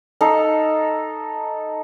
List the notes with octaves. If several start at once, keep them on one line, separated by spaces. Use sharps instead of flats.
D#4 A4 F5